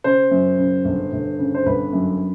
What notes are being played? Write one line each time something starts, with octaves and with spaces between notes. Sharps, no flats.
C#3 C5
F#2
C#3
G1
G1
C#3
C5
G1 B4
F#2